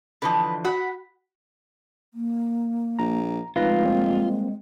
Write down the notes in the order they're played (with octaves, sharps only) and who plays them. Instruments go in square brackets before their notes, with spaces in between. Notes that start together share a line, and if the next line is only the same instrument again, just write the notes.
[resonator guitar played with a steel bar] D3 E3 F3 [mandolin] B4 D#5
[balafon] F#4 [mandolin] F#5 B5
[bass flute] A#3
[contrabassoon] A#1 [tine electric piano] A#5
[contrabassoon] F1 [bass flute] G#3 [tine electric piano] D#4 B4 A#6 [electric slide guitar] F4
[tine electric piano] G3 A#3 C4